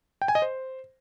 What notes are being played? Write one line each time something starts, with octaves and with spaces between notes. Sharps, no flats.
G5
G#5
D#5
C5